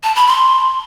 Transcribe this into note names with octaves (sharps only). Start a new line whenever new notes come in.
A5
B5
C6